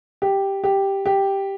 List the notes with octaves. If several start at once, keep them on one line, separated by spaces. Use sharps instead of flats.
G4
G4
G4